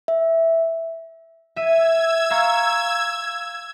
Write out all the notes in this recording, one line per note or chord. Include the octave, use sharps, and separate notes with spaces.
E5
E5 E6 G#6 D#7
F5 A#5 C#6